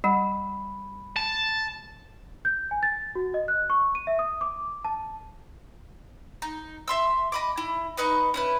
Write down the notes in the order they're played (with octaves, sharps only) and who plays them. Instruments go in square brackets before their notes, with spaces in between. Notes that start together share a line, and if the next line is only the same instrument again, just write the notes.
[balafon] G3 F#5 [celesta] B5
[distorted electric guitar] A5
[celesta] G6
G#5
A6
F#4
D#5
F#6
C#6
D#7
E5
D#6
D6
A5
[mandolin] D#4
E5 C6 E6
D#5 B5 D6
E4
D#4 B4 D#5 C#6
C#4 E4 B4